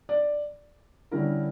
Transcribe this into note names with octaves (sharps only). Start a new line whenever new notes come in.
D5
D3 G3 C#4 E4 A#4